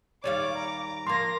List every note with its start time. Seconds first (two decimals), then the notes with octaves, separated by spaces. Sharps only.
0.24 D#2 G3 C#5 D5 F5 D6
0.55 A#5
1.07 F3 A#3 F5 C6 A#6